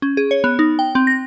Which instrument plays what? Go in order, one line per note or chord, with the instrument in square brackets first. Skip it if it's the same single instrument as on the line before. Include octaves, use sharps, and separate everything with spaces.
[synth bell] C#4
G#4
C#5
B3
D#4
G5
C4
A#6